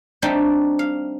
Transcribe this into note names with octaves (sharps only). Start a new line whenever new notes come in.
G3 A3 C4 D4 D#4 G4
F5